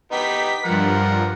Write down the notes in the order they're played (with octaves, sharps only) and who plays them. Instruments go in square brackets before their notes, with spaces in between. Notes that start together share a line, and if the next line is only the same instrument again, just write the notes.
[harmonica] B3 D#4 G4 [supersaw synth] B6
[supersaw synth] G2 F3 [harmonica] A#4 F#5